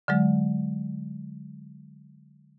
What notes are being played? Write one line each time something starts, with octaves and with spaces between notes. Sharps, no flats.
D3 F#3 G#3